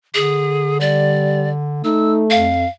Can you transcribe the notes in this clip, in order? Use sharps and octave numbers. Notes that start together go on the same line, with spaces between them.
D3 G#4
G3 D5
A3 D#4 E6
F2 F5